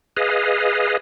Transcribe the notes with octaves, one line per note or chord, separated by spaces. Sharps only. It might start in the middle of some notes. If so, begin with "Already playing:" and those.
G#4 B4 D#5 F5